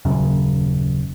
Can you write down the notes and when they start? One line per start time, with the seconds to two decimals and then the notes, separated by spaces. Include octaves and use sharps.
0.05 D#1 F#2 C#3